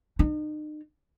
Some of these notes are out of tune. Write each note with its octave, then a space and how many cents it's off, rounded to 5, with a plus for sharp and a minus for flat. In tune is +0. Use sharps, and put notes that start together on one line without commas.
D#4 -40